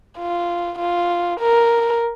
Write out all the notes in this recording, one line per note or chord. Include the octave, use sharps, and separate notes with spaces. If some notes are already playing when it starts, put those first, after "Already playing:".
F4
F4
A#4